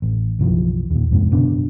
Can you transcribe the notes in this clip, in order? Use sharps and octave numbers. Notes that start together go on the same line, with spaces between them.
A1
F#1 B1 E3 F3
D#2 A#2
F2 G#2 C3
F#1 B2 D3 D4